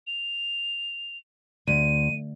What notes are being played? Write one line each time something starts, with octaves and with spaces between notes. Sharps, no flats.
F7
D2 D#7